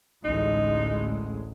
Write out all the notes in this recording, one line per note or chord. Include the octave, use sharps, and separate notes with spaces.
A1 D2 G#3 D#4